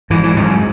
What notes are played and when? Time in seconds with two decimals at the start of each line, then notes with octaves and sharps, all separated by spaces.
0.10 G#2 E3
0.24 E3
0.36 G#2 F#3